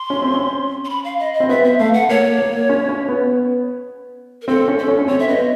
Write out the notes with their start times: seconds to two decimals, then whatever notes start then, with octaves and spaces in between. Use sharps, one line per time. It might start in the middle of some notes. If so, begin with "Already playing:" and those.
Already playing: C6
0.10 C#4
0.22 C4
0.34 C#4
0.85 C6
0.90 B5
1.04 F5
1.19 D#5
1.34 D#5
1.40 C4
1.49 B3 E5
1.64 E5
1.79 A3 F5
1.94 F#5
2.09 A#3 C#5
2.38 A#3
2.69 C#4
2.89 C#4
3.09 B3
4.42 A#4
4.48 C4 A4
4.68 C#4
4.78 A4
4.88 C#4
4.99 C#4
5.07 C4 C#5
5.19 E5
5.28 B3 D#5